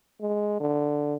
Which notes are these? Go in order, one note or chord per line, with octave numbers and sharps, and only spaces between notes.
G#3
D3